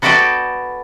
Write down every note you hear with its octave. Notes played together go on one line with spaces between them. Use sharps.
B3 F#4 A4 B4 D5 G5